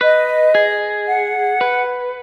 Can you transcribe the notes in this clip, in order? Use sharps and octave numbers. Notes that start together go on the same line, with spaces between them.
B4 D#5
G#4
F#5
B4